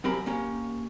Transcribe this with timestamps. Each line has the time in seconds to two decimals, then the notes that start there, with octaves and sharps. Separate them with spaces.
0.04 F#2 C4 G4 A#4 B5
0.26 A#3 C#4 G4